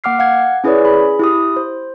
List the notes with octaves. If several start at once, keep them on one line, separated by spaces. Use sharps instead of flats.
A#3 F#5 D6 F6 C7
F5 F#5 G#6
C#4 E4 G#4 B4 C#5 D5
G#4 B5
E4 G4 D#6
C5